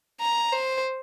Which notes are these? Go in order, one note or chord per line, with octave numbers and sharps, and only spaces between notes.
A#5
C5